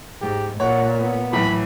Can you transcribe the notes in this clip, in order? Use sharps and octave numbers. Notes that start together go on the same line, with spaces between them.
G#2 G4
A#2 C#5 F#5
B3
A2 E3 F#3 B5